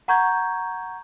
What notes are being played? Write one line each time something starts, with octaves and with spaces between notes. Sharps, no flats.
F#5 A#5 C#6 G6 G#6